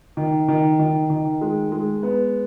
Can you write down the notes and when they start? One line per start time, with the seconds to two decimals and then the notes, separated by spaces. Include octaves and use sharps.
0.17 D#3
0.48 D#3
0.79 D#3
1.10 D#3
1.41 G#3
1.72 G#3
2.03 B3